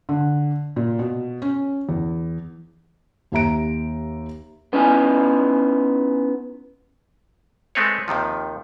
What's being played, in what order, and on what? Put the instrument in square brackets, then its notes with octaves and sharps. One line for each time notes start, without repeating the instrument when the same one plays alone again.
[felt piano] D3
A#2
B2
C#4
E2
D#2 G4 E5 A#5 D7
[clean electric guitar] B3 C#4 D#4 E4 G#5
[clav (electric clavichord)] G#3 A3 C4 B4 C#5
D#2 C3 D#3 F3